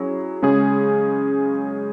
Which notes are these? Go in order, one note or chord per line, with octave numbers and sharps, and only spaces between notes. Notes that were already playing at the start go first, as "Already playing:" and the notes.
Already playing: F#3 C#4 E4 G#4
C#3 G#3 C#4 G#4